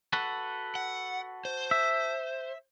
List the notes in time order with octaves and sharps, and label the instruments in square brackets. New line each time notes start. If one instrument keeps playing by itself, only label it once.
[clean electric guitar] F#4 A4 B4
[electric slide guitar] F#5
C5
[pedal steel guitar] E5